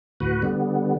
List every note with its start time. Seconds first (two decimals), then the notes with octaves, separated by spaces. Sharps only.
0.20 D2 A2 F#4 B4
0.42 D3 G3 B3